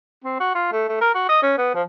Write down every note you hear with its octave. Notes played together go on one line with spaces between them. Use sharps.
C4
F#4
F4
A3
A3
A#4
F#4
D#5
C#4
B3
F3